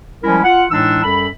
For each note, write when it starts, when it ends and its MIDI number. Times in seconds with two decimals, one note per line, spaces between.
0.23 0.39 53
0.23 0.39 55
0.23 0.39 56
0.23 0.39 61
0.23 0.39 64
0.23 0.39 70
0.43 0.63 65
0.43 0.63 78
0.70 1.02 45
0.70 1.02 52
0.70 1.02 56
0.70 1.02 62
0.70 1.02 63
0.70 1.02 88
1.03 1.26 42
1.03 1.26 55
1.03 1.26 69
1.03 1.26 83